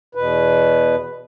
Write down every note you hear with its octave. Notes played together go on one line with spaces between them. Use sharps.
E2 B2 B4